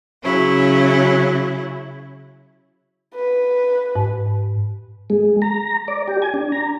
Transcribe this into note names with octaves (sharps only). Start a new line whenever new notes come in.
C#3 F#3 C#4 E4
B4
G#2
G#3
A#5
D5
G4
G#5
D4
A#5